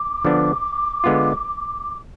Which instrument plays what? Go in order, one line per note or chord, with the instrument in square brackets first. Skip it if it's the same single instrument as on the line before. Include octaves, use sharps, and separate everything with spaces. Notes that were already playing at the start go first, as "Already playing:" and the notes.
Already playing: [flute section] D6
[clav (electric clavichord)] D3 F3 B3 D4
D3 G#3 B3 F4